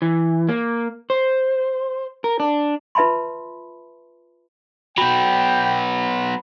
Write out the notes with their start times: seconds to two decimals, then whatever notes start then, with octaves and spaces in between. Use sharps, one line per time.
0.02 E3
0.49 A#3
1.10 C5
2.24 A#4
2.40 D4
2.95 F4 B4 E5 A5 B5 C6
4.98 F#3 B3 G5 B5